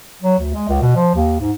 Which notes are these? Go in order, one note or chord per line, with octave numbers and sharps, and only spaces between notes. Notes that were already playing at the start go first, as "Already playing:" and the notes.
F#3
D2
G#3
C#2
B2
F3
D#2
G#2